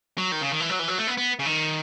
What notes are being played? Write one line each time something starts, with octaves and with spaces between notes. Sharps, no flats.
F#3
D#3
C#3
D#3
E3
F#3
E3
F#3
A3
B3
B3
C#3
D#3